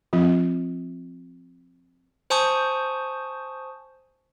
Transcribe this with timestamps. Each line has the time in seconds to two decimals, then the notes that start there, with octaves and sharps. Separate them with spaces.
0.13 F3 C4 F4
2.30 C5 G#5 A5 C#6 D#6 G6